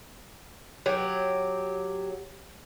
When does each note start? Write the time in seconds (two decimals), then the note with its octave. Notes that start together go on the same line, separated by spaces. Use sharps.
0.86 F#3 G4